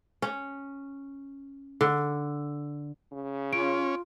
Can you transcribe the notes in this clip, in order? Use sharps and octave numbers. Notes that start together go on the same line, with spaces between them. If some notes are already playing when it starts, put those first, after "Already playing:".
C#4
D3
C#3
C#4 F4 D7